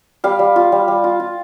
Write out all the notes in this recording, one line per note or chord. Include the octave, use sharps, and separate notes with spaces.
G3 F5
G3
F4
G3
G3
F4
F4